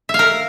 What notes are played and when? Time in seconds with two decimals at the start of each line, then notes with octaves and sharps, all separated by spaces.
0.09 E5
0.14 F5
0.19 A#4